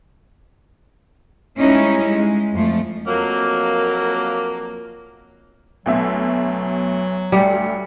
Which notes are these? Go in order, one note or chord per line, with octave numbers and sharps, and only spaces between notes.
G3 G#3 C#4 D#4 E4
G#3
F2 F3 A3
F2 F#3 A#3
D2 B2 F#3 E5
D2 G3 C#7